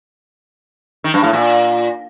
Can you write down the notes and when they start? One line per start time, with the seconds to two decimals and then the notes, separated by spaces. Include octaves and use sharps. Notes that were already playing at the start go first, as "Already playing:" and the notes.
1.04 D#3
1.14 G2
1.23 A2
1.33 A#2